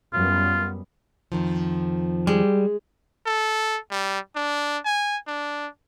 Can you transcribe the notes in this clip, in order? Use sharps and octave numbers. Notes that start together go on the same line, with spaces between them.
F#2 G3 B3 F4
F2 D#3 F3
G3 G#3
A4
G3
D4
G#5
D4